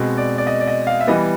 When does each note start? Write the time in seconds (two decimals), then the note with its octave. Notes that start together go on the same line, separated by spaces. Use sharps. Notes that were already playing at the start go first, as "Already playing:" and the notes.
Already playing: B2 G#3 C4
0.18 D5
0.38 D5
0.47 D#5
0.60 D5
0.68 D#5
0.87 F5
1.01 E5
1.07 E3 G3 B3 D#5